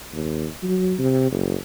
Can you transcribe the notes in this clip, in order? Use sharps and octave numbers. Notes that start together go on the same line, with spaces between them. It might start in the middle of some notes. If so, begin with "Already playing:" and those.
D#2
F#3
C3
F#1